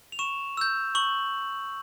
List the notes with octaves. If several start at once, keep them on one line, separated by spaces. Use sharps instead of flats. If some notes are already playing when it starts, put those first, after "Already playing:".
F7
C#6 E7
E6 G6
C#6 F#7